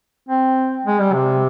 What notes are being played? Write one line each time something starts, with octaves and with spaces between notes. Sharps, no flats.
C4
G#3
G3
C3